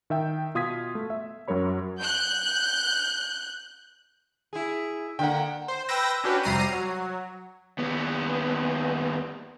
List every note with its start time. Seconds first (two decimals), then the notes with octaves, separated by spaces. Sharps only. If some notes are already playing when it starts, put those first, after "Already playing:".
0.10 D#3 E5 G5
0.55 B2 F4 D#6 G#6 B6
0.95 A3
1.10 E5
1.48 F#2 F#3 A#4 C#5 B5
1.99 F#6 G6
4.53 E4 G#4
5.19 D3 A#3 F#5 G5
5.68 C5
5.89 B4 G5 E6 A#6
6.24 C#4 D4 F#4 G4 B4
6.43 F2 C3 G3 A#5 C7 D#7
6.72 F#3
7.78 D#2 B3